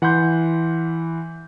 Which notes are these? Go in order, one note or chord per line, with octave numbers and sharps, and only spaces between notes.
E3 F#5 B5 C6 G6